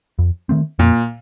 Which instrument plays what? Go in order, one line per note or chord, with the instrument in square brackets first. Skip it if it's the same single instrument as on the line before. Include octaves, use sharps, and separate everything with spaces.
[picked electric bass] F2
D#3 A3 C4
[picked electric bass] F2 [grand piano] A#2